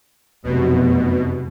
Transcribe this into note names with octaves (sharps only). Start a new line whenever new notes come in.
F1 F#2 B2